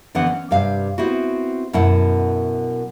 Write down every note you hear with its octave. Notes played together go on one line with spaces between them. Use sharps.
D3 E3 B3 C4 F#5
C#4
G2 C3 F5
B3 C4 E4 F#4
F#2 B2 E4 F#5 A5